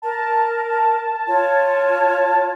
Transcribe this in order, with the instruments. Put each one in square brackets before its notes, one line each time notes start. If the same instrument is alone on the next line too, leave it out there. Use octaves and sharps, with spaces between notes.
[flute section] A#4 [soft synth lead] A5
[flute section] F4 C#5